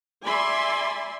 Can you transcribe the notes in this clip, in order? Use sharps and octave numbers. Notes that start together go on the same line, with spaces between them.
D5 E5 G#5 B5 C6